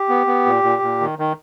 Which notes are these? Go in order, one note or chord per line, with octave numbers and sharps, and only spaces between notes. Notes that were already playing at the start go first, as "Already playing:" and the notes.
Already playing: G4
B3
B3
A#2
A#2
A#2
D#3
D#3